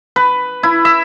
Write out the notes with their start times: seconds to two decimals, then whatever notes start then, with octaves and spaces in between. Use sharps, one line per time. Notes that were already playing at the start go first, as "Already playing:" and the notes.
0.16 B4
0.63 E4
0.85 E5